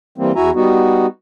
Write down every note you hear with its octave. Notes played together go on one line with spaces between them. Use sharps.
E3 G3 A#3 C4
E2 E4 F#4 E5 G#5 A#5
G3 B3 D#4 F#4